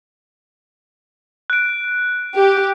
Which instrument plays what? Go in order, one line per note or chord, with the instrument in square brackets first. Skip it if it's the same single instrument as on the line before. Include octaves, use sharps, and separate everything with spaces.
[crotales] F#6 D7
[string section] G4